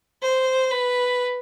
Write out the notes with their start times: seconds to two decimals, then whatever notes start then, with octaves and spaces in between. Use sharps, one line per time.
0.22 C5
0.71 B4